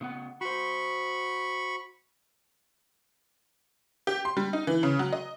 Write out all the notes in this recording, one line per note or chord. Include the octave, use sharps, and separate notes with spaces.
C#3 B3 F#5
F#4 C5 B5 C#6
G4
C6
G3
D#4
E3
C#3
F#3
D#5